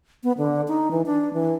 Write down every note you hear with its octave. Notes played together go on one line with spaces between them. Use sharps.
B3
D3
D#4
E3
D4
E3